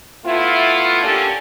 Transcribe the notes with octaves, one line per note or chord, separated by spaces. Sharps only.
A3 B3 E4 F4
A#3 C#4 D4 G4 A4